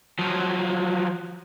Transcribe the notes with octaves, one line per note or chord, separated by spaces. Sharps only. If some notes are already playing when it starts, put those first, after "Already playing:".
F3 F#3